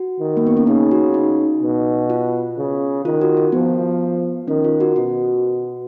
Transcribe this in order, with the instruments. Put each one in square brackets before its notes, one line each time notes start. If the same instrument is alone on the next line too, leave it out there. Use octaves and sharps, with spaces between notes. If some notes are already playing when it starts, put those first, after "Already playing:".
Already playing: [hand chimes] F#4
[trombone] D#3
[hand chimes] A#3
B3
C#4
[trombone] C#3 [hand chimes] D#4
[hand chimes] F#4
D#4
[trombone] B2
[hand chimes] F4
[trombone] C#3
[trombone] D#3 [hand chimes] F4
[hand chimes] F#4
F4
[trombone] F3 [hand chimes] B3
[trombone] D#3 [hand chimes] C#4
[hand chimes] F4
F#4
[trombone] B2 [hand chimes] F#4